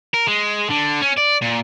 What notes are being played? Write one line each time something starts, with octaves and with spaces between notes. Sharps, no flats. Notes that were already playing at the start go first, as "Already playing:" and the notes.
A#4
G#3
D3
C#4
D5
A#2